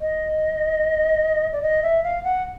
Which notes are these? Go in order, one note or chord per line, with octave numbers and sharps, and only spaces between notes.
D#5
D5
D#5
E5
F5
F#5